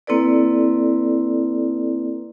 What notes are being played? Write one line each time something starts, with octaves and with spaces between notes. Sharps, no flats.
A#3 C4 E4 A4 B4 D5